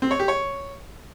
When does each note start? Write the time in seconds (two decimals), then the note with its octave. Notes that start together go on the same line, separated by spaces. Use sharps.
0.02 C4
0.11 C#5
0.19 G4
0.28 C#5